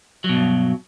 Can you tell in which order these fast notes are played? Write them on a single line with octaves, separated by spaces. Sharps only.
F#3 B2 G2